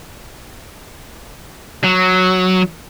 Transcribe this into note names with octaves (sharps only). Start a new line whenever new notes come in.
F#3